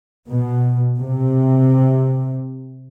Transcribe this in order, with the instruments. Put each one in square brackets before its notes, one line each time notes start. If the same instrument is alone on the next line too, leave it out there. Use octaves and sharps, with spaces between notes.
[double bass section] B2
C3